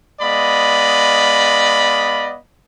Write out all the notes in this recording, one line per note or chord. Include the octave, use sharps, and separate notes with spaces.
G#3 B3 D5 D#5 F5 B5